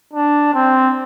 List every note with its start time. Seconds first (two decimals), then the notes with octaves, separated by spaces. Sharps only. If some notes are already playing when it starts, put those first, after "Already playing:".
0.13 D4
0.54 C4